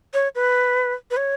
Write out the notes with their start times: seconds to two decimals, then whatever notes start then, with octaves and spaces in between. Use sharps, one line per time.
0.14 C#5
0.35 B4
1.11 B4
1.17 C#5